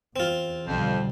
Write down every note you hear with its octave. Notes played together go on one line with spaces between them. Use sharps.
E2 C4 F4
B1 F2 D3 G3 C5